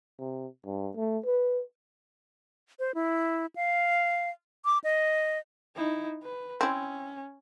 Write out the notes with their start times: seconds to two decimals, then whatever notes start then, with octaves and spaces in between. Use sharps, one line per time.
0.19 C3
0.65 G2
0.96 A3
1.25 B4
2.79 C5
2.95 E4
3.56 F5
4.65 D6
4.84 D#5
5.76 D#4 E4
6.23 B4
6.61 C4 C#4 E4